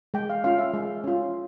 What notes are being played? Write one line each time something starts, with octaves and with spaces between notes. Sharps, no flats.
G#3 G5
F5
C#4 F4 F5
E5
G#3
C#4 F4